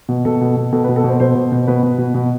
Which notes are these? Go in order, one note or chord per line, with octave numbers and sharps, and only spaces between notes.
B2
B2 A4
B2
B2
B2 A4
B4
B2
A4
B2 C5
B2 C5
B2
B2
B2 B4
B2
B2
B2